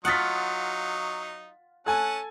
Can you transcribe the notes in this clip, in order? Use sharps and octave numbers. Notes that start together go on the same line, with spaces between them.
F#3 D#4 F4 F#5 D#6 A6 B6
C#4 A4 F#5 G#5 A5